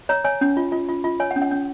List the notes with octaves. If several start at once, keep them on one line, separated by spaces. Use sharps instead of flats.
C#5 A#5
C#5 G#5
C#4
F4
F4
F4
F4
C#5 G#5
F#5
C#4
F#5
C#4